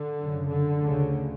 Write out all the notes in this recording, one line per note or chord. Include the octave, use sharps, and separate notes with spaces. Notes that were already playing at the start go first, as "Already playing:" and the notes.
Already playing: D3
F#2 C#3
D3
D2 C#3